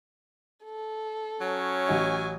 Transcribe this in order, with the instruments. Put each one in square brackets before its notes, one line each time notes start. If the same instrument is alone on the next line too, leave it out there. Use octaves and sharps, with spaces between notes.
[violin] A4
[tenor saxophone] F#3 [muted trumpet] C#4
[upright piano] A1 F#4 D#5 [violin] G#5